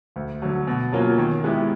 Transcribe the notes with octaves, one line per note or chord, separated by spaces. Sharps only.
D2
D3 F#3
B2
F#3 A#3 C#4 F4
D#3
G#3 B3 E4 G4